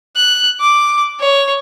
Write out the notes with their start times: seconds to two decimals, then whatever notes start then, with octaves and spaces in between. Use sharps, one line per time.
0.16 F#6
0.60 D6
1.19 C#5